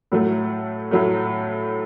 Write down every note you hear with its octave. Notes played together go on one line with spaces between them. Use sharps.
A2 F#3 A3
A2 F#3 A3